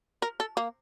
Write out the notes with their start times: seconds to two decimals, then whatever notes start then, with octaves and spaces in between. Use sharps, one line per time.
0.22 A#4
0.40 A4
0.57 A#3